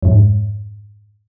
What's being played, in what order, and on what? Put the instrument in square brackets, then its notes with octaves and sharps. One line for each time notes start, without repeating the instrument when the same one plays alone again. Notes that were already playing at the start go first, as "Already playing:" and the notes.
[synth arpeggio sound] F2 G#2